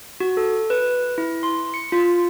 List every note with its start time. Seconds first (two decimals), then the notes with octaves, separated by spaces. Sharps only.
0.20 F#4
0.37 A4
0.70 B4
1.18 E4
1.43 C6
1.74 C#7
1.92 F4